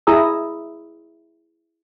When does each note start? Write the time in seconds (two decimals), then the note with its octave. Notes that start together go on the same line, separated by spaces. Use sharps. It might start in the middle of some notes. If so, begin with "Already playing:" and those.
0.07 E4 G#4 A#5 D#6 E6